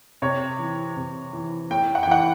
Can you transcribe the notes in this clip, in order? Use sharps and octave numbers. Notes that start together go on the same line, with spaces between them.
C3 C#5
E3
C3
E3
A2 G5
F#5
G5
E3 F#5